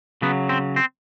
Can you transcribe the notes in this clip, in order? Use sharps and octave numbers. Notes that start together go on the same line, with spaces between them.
C#3 F#3 B3
C4
C4